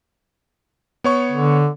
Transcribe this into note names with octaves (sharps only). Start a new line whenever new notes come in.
B3 C#5 C#6
D3